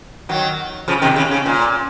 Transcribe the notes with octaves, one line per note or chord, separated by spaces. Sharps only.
D#3 F#3
C#3 F3
C3 D#3
C#3
C#3
A#2